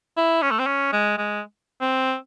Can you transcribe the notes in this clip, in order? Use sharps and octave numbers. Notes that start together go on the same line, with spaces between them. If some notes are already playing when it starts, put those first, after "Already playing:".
E4
C#4
A3
C4
C#4
G#3
G#3
C4